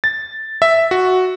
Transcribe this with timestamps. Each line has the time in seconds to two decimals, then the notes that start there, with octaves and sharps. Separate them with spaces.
0.04 A6
0.62 E5
0.91 F#4